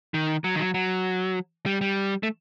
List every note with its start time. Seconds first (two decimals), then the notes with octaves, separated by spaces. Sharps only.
0.14 D#3
0.44 F#3
0.55 D#3
0.59 F#3
0.74 F#3
1.66 G3
1.81 G3
2.23 A3